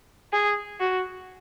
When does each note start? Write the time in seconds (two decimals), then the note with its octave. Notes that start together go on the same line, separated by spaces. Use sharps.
0.33 G#4
0.80 F#4